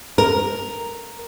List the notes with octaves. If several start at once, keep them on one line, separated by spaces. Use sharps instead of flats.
A#4